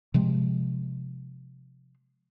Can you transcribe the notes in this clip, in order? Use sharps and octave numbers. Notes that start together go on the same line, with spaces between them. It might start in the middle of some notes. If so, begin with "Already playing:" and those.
C3 F3 G#3